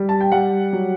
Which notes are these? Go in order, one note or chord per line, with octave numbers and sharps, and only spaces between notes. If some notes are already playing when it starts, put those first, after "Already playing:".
Already playing: G3
A5
G5
G3 F#5
F#3